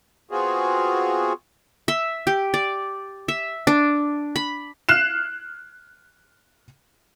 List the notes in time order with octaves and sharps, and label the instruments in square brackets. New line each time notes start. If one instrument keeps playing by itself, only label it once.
[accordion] B3 C4 F4 F#4 G#4
[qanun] E5
G4
D5
E5
D4
B5
[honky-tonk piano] F6 F#6 C7 E7